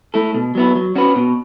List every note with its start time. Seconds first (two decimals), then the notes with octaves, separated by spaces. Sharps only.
0.14 A3 E4 A4
0.34 B2
0.55 F#3 B3 E4
0.75 F#3
0.96 C#4 F#4 B4
1.16 B2